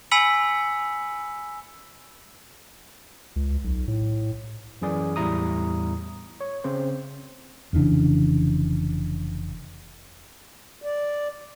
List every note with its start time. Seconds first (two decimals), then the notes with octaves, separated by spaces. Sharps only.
0.11 G#5 B5 E6 B6 C#7 F#7
3.36 C#2
3.64 B1
3.88 A2
4.82 F#2 E3 G#4 D5
5.16 E2 A2 G3 E4 A#5 D#6
6.41 C#5
6.64 C#3 C4 C5
7.73 F1 C#3 E3 D4
10.82 D5